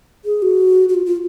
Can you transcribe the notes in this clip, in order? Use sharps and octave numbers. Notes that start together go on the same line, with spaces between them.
G#4
F#4
F#4
F4
F4